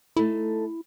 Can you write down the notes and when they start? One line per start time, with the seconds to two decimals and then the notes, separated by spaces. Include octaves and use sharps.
0.16 A3 D#4 E4 A4